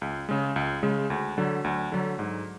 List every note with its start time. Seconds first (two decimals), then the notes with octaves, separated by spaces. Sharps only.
0.02 C#2
0.29 C#3 G#3
0.56 C#2
0.83 C#3 G#3
1.10 D2
1.38 D3 F#3
1.64 D2
1.92 D3 F#3
2.19 G#2